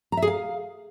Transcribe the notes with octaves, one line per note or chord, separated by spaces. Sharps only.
A#5
E5
G#4
F5